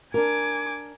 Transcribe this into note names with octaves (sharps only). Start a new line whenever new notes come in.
D4 A#4 G#5 D6